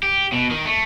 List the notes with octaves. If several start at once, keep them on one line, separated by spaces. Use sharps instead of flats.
G4
B2
D#3
A3